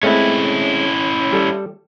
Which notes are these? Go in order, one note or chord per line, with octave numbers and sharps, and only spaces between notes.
G#3 A3 C4 C#4 E4
G3 A4